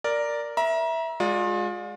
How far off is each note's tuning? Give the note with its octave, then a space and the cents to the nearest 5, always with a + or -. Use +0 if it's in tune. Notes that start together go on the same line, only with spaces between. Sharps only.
A#4 +0 D5 +0
E5 -5 A#5 +35
G#3 +0 F4 +35 D5 +5